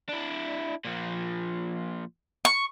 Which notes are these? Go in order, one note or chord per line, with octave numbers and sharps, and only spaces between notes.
D4 E4
A#2 F3
C#6